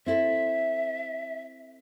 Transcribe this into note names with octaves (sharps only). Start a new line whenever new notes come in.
C4 E4 A4 E5